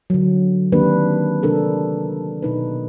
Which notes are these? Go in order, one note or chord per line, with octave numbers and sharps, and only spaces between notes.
D3 F#3
D#3 A#3 C4 D4 G4 B4
C3 D4 A4 A#4
B2 D#4 B4